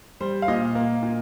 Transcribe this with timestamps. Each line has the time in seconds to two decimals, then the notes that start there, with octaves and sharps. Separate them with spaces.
0.21 G3 C5
0.42 F5
0.48 A#2 D#5
0.75 A#3
1.03 A#2